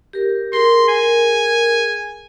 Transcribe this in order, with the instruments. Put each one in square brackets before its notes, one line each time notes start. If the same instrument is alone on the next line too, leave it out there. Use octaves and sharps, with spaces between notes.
[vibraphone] G4 A#4
[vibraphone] G#4 A#4 [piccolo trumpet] C6
[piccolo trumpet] G#5